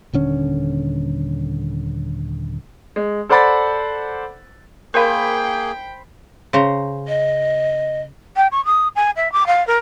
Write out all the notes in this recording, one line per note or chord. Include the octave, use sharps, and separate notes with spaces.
D#1 D3 C#4
G#3
A4 C5 D5 F#5 B5 A6
A#3 G#4 A#4 C5 F5 G5 B5
C#3 C5 A#5
D#5
G5
C#6
D#6
G#5
E5
D6
F5
A#4